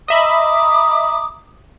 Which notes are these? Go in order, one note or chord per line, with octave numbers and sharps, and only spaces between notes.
D#5 E5 A#5 B5 D6 D#6